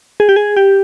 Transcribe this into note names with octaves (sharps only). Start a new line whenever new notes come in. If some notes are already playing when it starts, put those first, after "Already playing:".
G#4
G4
G#4
G4